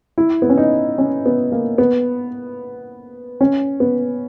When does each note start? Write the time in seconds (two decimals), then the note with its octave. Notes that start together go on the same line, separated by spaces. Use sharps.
0.18 E4
0.42 B3
0.49 C#4
0.58 D#4
0.98 C#4
1.26 B3
1.52 A#3
1.78 B3
3.41 C#4
3.80 B3